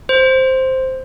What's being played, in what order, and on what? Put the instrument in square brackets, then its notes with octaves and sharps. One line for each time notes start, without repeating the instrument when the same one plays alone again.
[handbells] C5